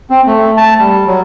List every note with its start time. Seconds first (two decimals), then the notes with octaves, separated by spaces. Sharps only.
0.10 C4
0.26 A3
0.57 A5
0.79 G3
1.07 F#3